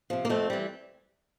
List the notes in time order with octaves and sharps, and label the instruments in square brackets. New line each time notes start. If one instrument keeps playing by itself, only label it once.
[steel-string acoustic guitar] C3 F3
A#3
F2 A3 C4
E3 G3